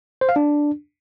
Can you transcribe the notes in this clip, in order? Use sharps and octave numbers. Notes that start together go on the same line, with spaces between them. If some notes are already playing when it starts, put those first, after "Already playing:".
C5
F5
D4